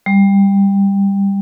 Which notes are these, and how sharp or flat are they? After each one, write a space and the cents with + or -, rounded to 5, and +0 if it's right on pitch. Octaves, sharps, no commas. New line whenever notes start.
G3 +15